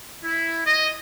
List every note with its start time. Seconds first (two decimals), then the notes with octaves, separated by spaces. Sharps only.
0.23 E4
0.64 D#5